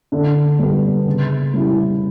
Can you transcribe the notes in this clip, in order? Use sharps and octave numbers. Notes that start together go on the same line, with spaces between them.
D3
G3 B3
C#3
G3 C#4 E4